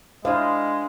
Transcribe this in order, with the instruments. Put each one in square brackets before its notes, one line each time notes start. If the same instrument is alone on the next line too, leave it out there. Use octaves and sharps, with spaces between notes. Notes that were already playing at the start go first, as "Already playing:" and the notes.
[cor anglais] G#3 [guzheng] D4 E4 [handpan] C5 F5 [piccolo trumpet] D#5